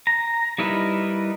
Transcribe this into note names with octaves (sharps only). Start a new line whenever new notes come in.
A#5
G3 D#4 E4 A#4 B4